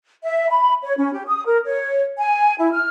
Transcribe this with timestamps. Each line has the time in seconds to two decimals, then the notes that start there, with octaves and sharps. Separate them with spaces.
0.23 E5
0.49 B5
0.83 C#5
0.97 C#4
1.12 G4
1.27 D#6
1.46 A#4
1.65 C#5
2.18 G#5
2.59 E4
2.73 F6